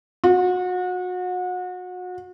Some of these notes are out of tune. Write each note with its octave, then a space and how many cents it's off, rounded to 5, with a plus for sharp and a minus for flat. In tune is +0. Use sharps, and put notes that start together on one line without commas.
F#4 -30